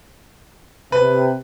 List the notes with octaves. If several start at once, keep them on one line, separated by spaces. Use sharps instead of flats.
C3 B4